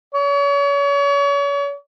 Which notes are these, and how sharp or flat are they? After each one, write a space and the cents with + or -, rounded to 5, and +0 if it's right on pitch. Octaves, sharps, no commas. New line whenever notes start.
C#5 +35